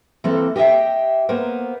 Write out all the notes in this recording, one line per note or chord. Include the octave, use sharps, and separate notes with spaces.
E3 A#3 C4 A4
G4 D#5 E5 G5
A#3 B3 A#4 C5